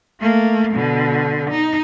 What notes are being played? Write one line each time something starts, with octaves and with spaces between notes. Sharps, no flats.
A3 A#3
B2 D3
D#4